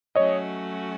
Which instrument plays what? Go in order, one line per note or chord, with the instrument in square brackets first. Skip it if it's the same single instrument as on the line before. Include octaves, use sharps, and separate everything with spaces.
[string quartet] F#3 A3 C#4 F#4 [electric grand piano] C#5 D#5